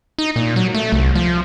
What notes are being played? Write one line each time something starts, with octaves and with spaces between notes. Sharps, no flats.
D#4
A#2
F#3
A3
C2
F3